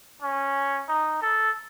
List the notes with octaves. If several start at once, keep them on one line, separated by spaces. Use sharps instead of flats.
C#4
D#4
A4